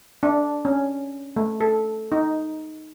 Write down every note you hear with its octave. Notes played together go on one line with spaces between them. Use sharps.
D4
C#4
A3
A4
D#4